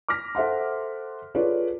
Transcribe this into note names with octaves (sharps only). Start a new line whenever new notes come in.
D6 F6 A#6 B6
A4 C5 E5 F#5 C6
F4 G#4 A4 B4 C#5 D5